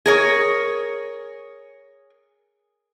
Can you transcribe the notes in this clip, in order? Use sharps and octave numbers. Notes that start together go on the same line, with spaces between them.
G#4 A#4 C#5